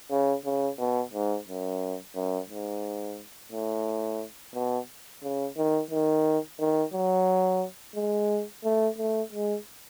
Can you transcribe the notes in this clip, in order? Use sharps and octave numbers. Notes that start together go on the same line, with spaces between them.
C#3
C#3
B2
G#2
F#2
F#2
G#2
A2
B2
C#3
D#3
D#3
D#3
F#3
G#3
A3
A3
G#3